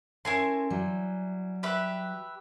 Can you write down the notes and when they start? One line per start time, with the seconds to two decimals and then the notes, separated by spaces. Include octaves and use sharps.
0.25 C#4 E4 A4 A#4 G#5 C6
0.70 F#3 G3
1.63 G4 B4 E5